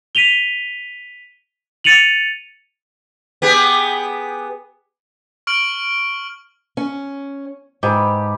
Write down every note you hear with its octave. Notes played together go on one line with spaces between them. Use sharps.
B6 D#7 F7 G7
A6 C#7 D#7 F7 F#7
B3 G4 G#4
C#6 F6 D7 F#7
C#4
G#2 G4 B4